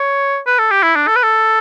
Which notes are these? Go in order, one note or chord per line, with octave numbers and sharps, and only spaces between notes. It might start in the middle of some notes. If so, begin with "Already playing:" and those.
Already playing: C#5
B4
A4
G4
E4
D4
A4
B4
A4